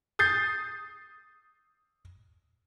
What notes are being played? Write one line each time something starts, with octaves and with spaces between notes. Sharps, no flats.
D#6 G6 A6 C7